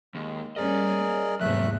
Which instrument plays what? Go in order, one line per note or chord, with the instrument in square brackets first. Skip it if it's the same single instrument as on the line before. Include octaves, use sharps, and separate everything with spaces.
[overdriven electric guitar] D#2 [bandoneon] G#3
[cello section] G3 A#3 C#4 [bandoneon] G#4 A#4 [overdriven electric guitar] D5 D#5
[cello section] E2 G#2 C3 [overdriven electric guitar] F#3 A#3 [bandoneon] A3 E5 F#6